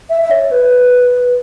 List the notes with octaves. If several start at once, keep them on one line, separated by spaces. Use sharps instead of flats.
E5
E5
C#5
B4